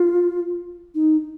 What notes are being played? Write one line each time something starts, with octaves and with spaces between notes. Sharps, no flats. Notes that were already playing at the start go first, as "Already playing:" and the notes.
Already playing: F4
D#4